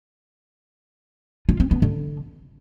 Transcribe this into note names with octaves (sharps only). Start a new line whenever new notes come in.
F4
C4
B3
D3